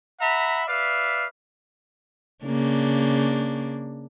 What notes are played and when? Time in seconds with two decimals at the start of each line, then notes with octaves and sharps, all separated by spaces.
0.20 E5 F#5 A#5 B5
0.67 B4 D5 E5 F5
2.45 C#3 A#3 D4